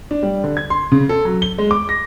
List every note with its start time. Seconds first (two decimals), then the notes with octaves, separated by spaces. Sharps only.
0.11 D4
0.23 G3
0.44 D3
0.57 G#6
0.70 C6
0.92 C#3
1.09 A4
1.25 F#3
1.42 G7
1.58 G#3
1.71 D6
1.89 A#6